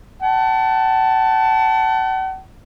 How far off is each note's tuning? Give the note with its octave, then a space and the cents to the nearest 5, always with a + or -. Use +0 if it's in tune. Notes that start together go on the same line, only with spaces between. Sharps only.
F#5 +40 A5 +0